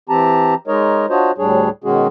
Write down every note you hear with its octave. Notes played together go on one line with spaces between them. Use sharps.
E3 C4 G4 A5 A#5
G#3 D#4 A#4 C#5 D#5
D4 F4 F#4 C5 C#5 D#5
D2 A2 G3 D4 G#4 C#5
B2 D#3 G#3 C#4 F#4 G#4